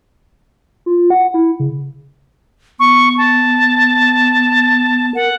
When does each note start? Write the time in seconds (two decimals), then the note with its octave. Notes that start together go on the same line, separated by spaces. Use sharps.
0.86 F4
1.10 F#5
1.34 E4
1.60 C#3
2.79 B3 C#6
3.17 A5
5.15 A#4 F#5